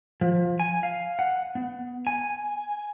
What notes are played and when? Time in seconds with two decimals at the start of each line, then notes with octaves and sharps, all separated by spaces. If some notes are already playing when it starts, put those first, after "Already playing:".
0.21 F3
0.60 G#5
0.83 F5
1.19 F#5
1.55 B3
2.07 G#5